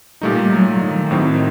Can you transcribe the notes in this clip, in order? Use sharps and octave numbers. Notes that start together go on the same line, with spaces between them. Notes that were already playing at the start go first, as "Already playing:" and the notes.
A#2 G3 A3 D#4
F#3
D#3
A2 F#3 C4 D#4